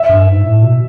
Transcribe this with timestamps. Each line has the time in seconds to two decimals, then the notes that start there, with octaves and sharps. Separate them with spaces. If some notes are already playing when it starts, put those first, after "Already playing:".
Already playing: E5
0.09 G2
0.27 G#2
0.44 A2
0.62 B2